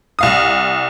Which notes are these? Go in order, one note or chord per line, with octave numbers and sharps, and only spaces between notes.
C2 F5 D#6